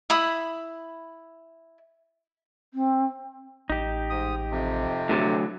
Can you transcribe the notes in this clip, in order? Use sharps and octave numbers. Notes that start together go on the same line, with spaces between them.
E4 B5 D#6
C4
A1 D#4 G4
G#2 D#6
F2 C3
A2 D3 F#3